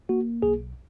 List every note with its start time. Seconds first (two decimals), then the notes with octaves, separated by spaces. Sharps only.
0.09 A#3 F#4
0.42 B1 G#4